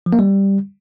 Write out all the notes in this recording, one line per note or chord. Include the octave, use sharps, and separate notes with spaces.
F3
A#3
G3